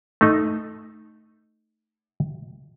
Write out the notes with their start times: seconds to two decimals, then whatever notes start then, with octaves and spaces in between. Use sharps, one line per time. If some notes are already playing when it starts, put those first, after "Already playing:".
0.21 A3 D#4